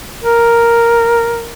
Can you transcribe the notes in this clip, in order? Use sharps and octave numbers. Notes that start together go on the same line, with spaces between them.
A#4